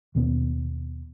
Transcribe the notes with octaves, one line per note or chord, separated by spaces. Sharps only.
D#2 B2 B3